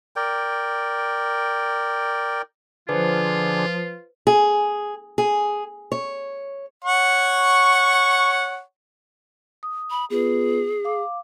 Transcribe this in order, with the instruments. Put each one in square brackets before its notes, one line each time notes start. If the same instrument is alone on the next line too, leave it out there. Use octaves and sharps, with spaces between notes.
[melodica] A#4 D5 G5
[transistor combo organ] D3 D4 G#4 [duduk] F3 [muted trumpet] F4 [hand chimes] B4 C5
[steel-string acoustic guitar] G#4
G#4
C#5
[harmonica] C#5 F#5 C#6
[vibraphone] D#6
[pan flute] B5
[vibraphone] B3 F4 B4 [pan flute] G#4
[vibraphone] F5 D6